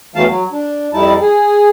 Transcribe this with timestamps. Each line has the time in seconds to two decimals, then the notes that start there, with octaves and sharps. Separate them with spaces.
0.15 E2 E3 F#3 A3 F5 A5
0.29 F#3
0.52 D4
0.93 F2 G3 D#4 E4 A5
1.22 G#4